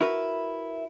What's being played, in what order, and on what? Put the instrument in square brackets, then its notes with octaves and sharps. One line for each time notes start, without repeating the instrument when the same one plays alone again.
[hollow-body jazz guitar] E4 F#4 A#4 B4